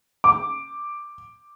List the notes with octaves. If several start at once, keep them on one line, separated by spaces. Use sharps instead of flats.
D6